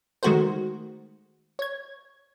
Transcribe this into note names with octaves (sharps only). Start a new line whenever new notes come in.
D#3 G#3 A3 F#4 A#4 C5
C#5 G#6